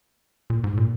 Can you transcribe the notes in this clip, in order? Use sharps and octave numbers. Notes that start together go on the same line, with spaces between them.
A#2
G#2
A#2